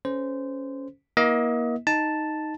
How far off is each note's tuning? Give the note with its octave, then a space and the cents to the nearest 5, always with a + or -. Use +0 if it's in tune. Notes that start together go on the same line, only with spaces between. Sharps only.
C#4 +0 A4 +0 C5 -20
A#3 +35 E4 -25 D#5 +35
D#4 +0 A5 +0